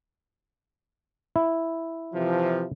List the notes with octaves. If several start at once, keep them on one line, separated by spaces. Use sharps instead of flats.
E4
C3 E3 F3